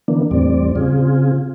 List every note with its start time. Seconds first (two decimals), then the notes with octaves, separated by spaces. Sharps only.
0.08 D3 E3 A#3 B3 D4
0.31 E2 A2 G3 C4 D5
0.76 C#3 C4 F4 G#4